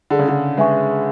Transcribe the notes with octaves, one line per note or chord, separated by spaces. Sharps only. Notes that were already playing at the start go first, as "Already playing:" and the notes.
D3 G#4
C#3
D3
G#3 B4 E5 G#5 C#6